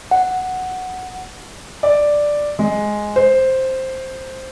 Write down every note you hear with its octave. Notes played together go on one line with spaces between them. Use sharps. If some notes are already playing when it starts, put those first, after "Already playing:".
F#5
D5
G#3
C5